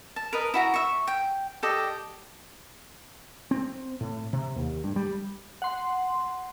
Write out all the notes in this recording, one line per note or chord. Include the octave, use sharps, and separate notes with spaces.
A5
A#4 B4 D#5
E4 F#4 A#5
E5 C#6
G5
G4 A4 D5 D#5
C4
A2
C3
D#2
G2
G3
F#5 C6